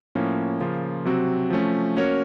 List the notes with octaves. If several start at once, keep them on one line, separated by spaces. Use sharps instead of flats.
A2 F3 A#3 C#4
C#3 F3 A#3 F4
C3 F#3 C4 F#4
F3 A3 C#4
A#3 C#4 F#4 A#4 C#5